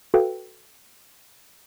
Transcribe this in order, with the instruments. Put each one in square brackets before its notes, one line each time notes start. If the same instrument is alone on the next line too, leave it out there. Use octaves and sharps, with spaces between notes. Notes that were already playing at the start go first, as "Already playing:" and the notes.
[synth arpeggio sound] F#4 A4 B4 F5 G5